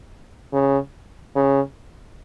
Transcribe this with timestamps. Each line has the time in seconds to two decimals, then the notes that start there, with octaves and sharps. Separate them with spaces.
0.53 C#3
1.36 C#3